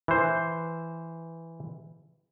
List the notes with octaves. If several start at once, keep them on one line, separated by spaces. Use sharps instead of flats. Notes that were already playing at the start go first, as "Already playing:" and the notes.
E3 C5